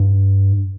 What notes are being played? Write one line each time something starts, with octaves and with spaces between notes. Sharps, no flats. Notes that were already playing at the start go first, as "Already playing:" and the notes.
Already playing: G2